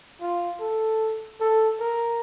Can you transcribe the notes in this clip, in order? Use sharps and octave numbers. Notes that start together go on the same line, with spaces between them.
F4
A4
A4
A#4